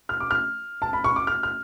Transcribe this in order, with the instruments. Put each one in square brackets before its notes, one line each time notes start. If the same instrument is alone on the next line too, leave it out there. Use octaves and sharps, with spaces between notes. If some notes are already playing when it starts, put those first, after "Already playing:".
[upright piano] F6
D6
F6
A5
B5
C#6
D6
F6
F6